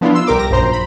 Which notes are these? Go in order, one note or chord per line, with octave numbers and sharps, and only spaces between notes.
F3 B3 D4 E4 F4
C6 E6
C2 G4 A#4 D6
A#6
A#1 F#2 C5 A#5 C6
B5